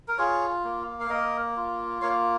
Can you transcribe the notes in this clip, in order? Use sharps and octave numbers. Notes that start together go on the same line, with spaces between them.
A#4
F4 G#4 C#5
A#3
F5
A#3 A#4 D#5
F4
A#3 C#5 F5